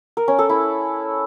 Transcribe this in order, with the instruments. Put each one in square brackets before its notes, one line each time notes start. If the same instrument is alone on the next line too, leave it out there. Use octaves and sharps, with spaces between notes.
[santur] A#4
C#4
A4
E4